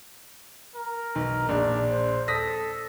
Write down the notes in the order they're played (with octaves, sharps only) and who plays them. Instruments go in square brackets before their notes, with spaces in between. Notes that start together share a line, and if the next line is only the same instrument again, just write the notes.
[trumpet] A#4
[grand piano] B1
[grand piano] A#1 [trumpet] D4
[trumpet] C5
[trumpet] A4 [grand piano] D#6 A#6 B6